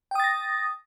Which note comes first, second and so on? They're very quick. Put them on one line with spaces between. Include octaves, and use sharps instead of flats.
G5 D#6 A6 A#6